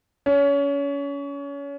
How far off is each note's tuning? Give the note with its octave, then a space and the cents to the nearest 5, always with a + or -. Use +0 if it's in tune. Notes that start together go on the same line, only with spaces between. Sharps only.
C#4 +30